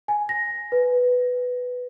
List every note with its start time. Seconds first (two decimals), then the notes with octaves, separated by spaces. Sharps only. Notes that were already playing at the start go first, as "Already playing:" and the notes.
0.08 G#5
0.29 A#6
0.72 B4